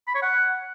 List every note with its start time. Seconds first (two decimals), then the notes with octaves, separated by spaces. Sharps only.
0.07 B5
0.15 C#5
0.22 F#5